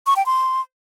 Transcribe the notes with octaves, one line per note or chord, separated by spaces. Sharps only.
C#6
G5
C6